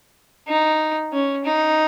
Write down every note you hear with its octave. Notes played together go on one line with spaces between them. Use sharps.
D#4
C#4
D#4